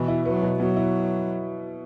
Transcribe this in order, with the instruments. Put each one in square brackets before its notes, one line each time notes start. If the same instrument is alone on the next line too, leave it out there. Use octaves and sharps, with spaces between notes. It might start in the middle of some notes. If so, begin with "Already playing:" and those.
Already playing: [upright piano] B2 [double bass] E3
[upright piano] E4
[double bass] F#3 [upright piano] B3
[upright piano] B2
[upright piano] B2 [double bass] F#3
[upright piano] E4